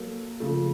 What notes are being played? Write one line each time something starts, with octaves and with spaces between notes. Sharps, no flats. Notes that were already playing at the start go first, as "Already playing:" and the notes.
Already playing: F#3 A#3 A4
C#3 F3 A3